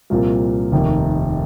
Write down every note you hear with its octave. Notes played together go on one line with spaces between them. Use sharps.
C2 A#2 F3 C4
F1 D#2 D#3